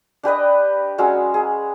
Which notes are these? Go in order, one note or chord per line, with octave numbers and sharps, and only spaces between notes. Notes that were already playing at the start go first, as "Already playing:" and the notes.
D4 G4 B4 D#5
F#3 G#3 C#4 E6
G#4